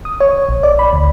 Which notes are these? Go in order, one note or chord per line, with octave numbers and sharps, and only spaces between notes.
D#6
C#5
A#1
D5
B5
D2